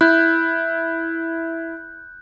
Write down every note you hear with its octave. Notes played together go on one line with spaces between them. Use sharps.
E4 F#6 G6